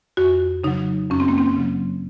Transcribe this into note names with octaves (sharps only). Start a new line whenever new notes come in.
F2 F#4
C#3 F#3 D#4
F#2 C#4
C4
A#3
C4
C#3 F#3